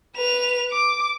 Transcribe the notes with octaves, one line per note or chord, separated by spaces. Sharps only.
B4 F7
D6